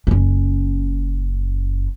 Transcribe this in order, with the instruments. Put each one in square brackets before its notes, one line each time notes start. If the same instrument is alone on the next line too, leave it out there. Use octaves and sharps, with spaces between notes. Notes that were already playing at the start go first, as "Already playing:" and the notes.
[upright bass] F#1 C#4